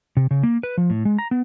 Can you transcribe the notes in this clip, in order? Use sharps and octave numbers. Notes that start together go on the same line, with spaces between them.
C3
C#3
A#3
B4
F3
A2
G#3
A#5
B3